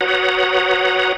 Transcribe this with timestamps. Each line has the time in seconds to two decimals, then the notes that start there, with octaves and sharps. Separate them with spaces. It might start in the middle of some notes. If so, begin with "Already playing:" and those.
0.01 F#4 B4 C#5 F#5 A#5 D#6